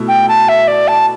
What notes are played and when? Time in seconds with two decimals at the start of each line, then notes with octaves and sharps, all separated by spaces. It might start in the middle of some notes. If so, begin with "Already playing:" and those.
Already playing: B2 A3 E4
0.08 G5
0.28 A5
0.49 E5
0.68 D5
0.88 A5